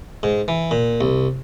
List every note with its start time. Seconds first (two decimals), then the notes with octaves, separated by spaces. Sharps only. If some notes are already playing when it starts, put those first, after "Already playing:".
0.23 G#2
0.48 E3
0.71 A#2
1.01 C2